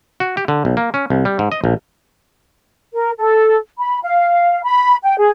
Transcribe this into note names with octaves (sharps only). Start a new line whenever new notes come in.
F#4
G4
D3
B1
A#3
C#4
C2
G3
G#2
D#5
A#1
A#4
A4
B5
F5
B5
G5
G#4